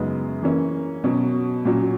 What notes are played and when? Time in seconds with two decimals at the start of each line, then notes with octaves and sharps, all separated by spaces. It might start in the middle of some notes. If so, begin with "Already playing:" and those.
Already playing: F#2 C#3 G#3 B3 D#4
0.43 E3 A#3 C#4
1.04 B2 F#3 C#4
1.65 A#2 F#3 C#4